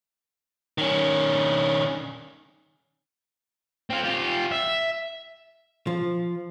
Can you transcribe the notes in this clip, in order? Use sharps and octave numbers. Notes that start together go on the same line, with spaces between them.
D#3 C#4
C4 F4
F4 G4
E5
F3